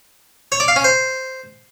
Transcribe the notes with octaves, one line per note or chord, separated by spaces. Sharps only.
C#5
D5
F5
C#4
C5